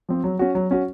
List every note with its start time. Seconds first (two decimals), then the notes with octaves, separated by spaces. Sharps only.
0.09 F3 C4
0.24 F#3
0.39 C#4 F#4
0.55 F#3
0.71 C#4 F#4